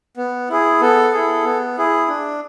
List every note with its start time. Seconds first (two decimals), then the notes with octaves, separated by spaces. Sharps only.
0.17 B3
0.49 E4 G#4
0.81 B3 A4
1.13 E4 G#4
1.44 B3
1.77 E4 G#4
2.08 D4